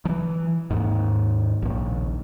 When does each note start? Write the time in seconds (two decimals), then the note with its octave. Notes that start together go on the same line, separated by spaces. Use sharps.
0.05 E3 F3
0.70 D#2 G#2
1.62 A#1 D#2